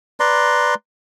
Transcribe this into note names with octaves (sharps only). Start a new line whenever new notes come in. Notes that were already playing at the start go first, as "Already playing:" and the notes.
B4 D5 A#5 C6